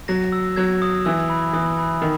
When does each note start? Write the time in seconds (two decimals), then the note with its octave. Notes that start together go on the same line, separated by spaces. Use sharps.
0.08 F#3 A#6
0.32 E6
0.56 F#3 G#6
0.82 D#6
1.05 E3 E6
1.30 B5
1.53 E3 D#6
1.79 B5
2.02 D#3